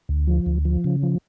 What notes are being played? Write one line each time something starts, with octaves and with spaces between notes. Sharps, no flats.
D2
F3
D2
F3
C#3
F3